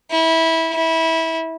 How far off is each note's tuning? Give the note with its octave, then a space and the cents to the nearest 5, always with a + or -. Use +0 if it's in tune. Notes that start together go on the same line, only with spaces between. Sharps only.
E4 -20
E4 -20